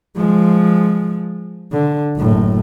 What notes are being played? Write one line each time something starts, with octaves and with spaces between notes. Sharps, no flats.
F3 G#3
D3
F#1 A2